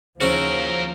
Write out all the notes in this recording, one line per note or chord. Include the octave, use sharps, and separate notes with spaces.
D#2 C#3 F3 C#4 E4 F#4 A#4 C5